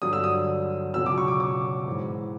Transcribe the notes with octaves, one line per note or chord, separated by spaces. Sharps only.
G2 D3 F#3 D#6
E6
D#6
C#2 B2 F#3 E6
D6
C#6
D6
D6
G#2 E3